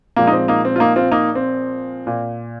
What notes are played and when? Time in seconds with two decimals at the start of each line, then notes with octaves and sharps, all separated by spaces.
0.16 A#2 F3 G#3 A#3
0.27 D#4
0.33 C4
0.48 A#3 D#4
0.65 C4
0.76 F4
0.80 A#3 D#4
0.96 C4 F4
1.12 A#3 D#4
1.35 C4
2.07 A#2